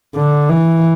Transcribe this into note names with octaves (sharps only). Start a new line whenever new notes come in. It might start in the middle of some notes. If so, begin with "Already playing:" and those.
D3
E3